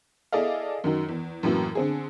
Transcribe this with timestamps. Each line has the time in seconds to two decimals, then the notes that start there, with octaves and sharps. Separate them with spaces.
0.32 E4 G#4 A4 D5 D#5 F5
0.84 F#2 D#3 F#3
1.09 E2
1.43 F#2 A2 E3 F#3 A#3
1.75 D3 C4 G#4